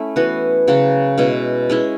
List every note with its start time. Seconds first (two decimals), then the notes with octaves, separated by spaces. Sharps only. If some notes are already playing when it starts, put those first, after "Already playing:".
Already playing: A3 C#4 E4
0.16 E3 B3 F#4
0.68 C#3 F#3 C#4 F#4
1.18 B2 G#3 C#4 E4
1.70 G#3 C#4 E4